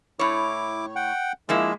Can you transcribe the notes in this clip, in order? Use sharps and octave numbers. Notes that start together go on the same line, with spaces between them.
A2 E4 C#5 D6
F#5 G5
F3 G#3 A#3 E4 G#4